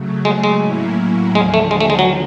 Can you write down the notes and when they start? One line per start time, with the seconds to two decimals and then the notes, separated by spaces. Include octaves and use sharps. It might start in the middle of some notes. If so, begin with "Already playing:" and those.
Already playing: C#3 F#3 A3
0.25 G#3
0.44 G#3
0.62 A2 F#3 A#3 C#4 E4
1.35 D#2 D3 F3 G#3
1.54 A3
1.71 G#3
1.80 A3
1.90 G#3
1.99 F#3